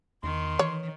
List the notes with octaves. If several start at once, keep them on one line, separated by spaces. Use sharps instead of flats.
E2 D#3 C6
E3 C#5